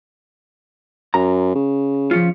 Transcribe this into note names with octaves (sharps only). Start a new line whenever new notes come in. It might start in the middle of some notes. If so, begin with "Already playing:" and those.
F#2 A#5
C#3
F3 C#4 F4